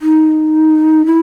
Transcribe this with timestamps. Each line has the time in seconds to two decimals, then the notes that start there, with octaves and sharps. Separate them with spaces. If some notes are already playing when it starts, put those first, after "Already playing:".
0.02 D#4
1.06 E4